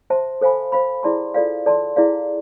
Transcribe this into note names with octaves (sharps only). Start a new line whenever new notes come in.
C5 E5 A5 C6
A4 C5 F5 G#5 B5
C5 F5 B5
E4 G#4 D5 A5 C6
F4 A4 D5 F5
A4 D5 A5 C6
E4 G#4 D5 F5